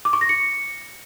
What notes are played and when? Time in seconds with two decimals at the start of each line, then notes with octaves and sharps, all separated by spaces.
0.05 D6
0.13 C#6
0.21 A#6
0.29 C#7